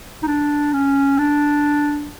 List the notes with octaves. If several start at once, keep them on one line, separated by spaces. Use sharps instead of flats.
D#4
D4
C#4
D4